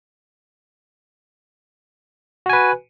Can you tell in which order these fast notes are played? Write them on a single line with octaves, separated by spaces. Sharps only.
F#4 G#5 B4